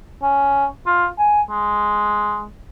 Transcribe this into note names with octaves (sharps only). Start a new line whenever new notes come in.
C#4
F4
G#5
G#3